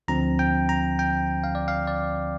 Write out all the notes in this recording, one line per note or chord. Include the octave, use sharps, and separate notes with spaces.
D2 D3 F3 C4 A#5
G5
A#5
G5
F5
D5
F5
D5